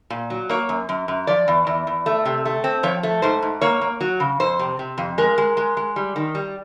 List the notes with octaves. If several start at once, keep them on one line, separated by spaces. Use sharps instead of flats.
A#2
F#3
A#3 C#5
F#2
F#2
F#2
F3 D5
E2
E2
E2
A3
C3
A3
C4
F3 C#5
A3
G#2 C5
G#2
A#3 C#5
A#3
F#3
C#3
F2 C5
C3
C3
F2
G#3 A#4
G#3
G#3
G#3
G3
D#3
G3